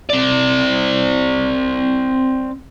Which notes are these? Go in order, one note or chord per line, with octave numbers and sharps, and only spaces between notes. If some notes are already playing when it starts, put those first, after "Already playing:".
C4 D5